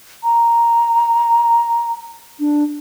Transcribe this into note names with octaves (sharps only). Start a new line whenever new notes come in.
A#5
D4